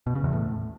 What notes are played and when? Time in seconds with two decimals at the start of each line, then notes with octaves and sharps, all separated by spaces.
0.07 B2
0.15 C#3
0.24 E2
0.33 A2